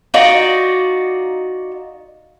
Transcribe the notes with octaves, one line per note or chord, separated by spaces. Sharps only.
D#4 F4 F#4 D5